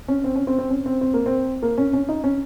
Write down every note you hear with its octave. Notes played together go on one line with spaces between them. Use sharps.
C#4
C4
C#4
C4
C4
C#4
C4
C4
A#3
C4
A#3
C#4
C#4
D#4
C#4